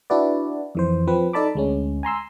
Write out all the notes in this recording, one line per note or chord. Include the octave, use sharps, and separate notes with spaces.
D4 E4 F#4 B4 D5
F2 E3 C5
F3 C4 B4
D#4 A4 D5 A5 B5 D6
D2 G#3 C#4
G#5 A#5 C6 E6